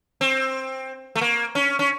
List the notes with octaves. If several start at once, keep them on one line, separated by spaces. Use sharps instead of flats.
C4
A3
A#3
C#4
C#4